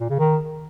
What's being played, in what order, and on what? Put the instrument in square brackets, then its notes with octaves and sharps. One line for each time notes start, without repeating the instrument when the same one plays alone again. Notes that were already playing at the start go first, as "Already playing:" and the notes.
[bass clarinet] A#2
C#3
D#3